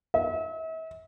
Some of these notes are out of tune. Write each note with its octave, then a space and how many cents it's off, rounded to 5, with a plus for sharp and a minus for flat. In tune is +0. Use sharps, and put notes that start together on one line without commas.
E5 -40